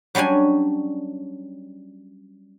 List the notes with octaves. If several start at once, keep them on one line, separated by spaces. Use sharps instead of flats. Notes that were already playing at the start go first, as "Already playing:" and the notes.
F#3 G3 C#4 D4 G#5